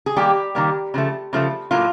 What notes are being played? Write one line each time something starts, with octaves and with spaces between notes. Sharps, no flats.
G#4
D#3 G3 A#3 G4
D#3 G3 A#3
C#3 F3 A3
C#3 F3 A3
A2 F#3 A#3 F4